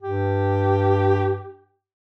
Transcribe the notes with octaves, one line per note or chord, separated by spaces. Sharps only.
G2 G4